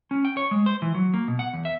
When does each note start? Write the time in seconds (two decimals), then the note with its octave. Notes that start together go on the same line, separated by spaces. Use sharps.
0.11 C#4
0.25 G5
0.37 C#5
0.51 G#3
0.66 C5
0.82 E3
0.95 F#3
1.14 A#3
1.28 B2
1.39 F#5
1.53 E2
1.65 E5